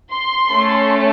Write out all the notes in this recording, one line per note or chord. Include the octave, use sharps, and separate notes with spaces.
C6
A3 C#4 A4